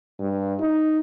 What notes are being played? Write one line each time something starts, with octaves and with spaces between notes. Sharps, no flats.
G2
D#4